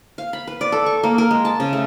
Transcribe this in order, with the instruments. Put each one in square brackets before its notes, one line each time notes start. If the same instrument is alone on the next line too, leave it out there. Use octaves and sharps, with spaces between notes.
[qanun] F5
B5
B4
D5
A4
C#6
A#3
A#4
G#3
A5
C#3
A3